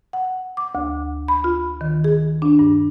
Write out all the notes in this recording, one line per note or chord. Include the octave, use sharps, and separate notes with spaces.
F#5
D6
D2
B5
F4
D#3
G#4
D4
G2